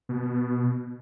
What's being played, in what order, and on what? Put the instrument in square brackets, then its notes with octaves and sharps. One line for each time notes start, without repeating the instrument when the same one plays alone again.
[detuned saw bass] B2